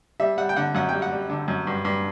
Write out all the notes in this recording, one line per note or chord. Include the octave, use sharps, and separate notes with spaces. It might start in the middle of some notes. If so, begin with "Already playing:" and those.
G3 E5
G3 F#5
G5
D3 F#5
F#2 F#5
G3 G5
F#5
G3
D3
F#2
G2
G2